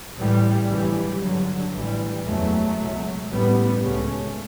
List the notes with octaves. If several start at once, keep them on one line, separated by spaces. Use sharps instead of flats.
A1 A2 E3 G3
G1 F#2 C#3 E3 G3
G1 G2 D3 F#3
A1 A2 E3 G3
F#1 E2 C#3 F#3 A3
C#2 B2
A1 G2 G3 B3
C#2 C#3 A3 C#4